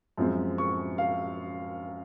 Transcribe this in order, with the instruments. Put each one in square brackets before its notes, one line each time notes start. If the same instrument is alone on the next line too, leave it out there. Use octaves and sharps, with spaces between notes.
[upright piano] F#2 F3 G#3 C4
C#6
F5